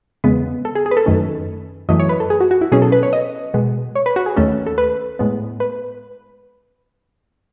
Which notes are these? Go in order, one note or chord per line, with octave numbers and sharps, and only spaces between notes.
E2 C#3 G#3 B3 B4
A4
G#4
G#4
B4
A4
F#2 D#3 A3 C#4
F#2 E3 A3 D#5
C#5
B4
A4
G#4
F#4
F#4
E4
B2 F#3 C#4 G#4
A4
B4
C#5
D#5
B2 G#3 B3
C#5
B4
F#4
G#4
D#2 D#3 A3 C#4 A4
A4
B4
A2 G#3 B3
B4